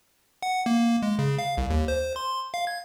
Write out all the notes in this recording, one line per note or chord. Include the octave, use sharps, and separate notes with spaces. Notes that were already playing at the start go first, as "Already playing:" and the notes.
F#5
A#3
G#3
C#3
F5
C2
D#2
C5
C6
F5
G#6